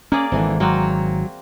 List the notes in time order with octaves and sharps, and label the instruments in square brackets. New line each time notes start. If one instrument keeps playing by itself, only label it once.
[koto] A#3 G#4 D5 [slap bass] C#4
[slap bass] G#1 [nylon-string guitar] D3 E3 C4
[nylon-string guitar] F#3 [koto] A#3 C4 F#4